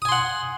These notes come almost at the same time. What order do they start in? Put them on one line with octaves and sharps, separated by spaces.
D#6 G#5 C6 F#5